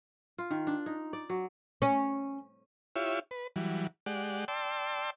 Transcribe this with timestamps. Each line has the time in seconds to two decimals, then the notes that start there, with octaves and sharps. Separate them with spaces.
0.38 F4
0.51 D#3
0.67 D4
0.86 D#4
1.13 D5
1.30 F#3
1.82 C#4
2.96 E4 F4 G4 C#5 E5
3.31 B4
3.56 E3 F#3 G3
4.06 G#3 G4 D5 F#5
4.48 D5 G5 A5 C6 E6